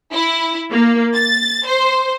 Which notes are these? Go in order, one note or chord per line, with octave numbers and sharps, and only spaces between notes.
E4
A#3
A6
C5